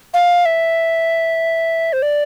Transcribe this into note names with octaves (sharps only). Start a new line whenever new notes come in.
F5
E5
C5
D5